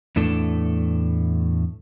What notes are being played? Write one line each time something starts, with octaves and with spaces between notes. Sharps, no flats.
E2 A2 A3 D4 A4